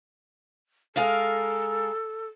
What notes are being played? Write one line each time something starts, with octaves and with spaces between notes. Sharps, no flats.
G#3 A4 A#4 F5